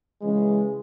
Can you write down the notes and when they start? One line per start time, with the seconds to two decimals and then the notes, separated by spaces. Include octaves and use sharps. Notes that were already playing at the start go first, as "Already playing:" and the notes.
0.22 C#3 E3 G#3